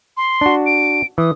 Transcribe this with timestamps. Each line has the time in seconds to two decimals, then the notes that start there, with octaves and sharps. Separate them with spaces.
0.17 C6
0.41 D4 F#4
0.66 D7
1.18 E3 D#6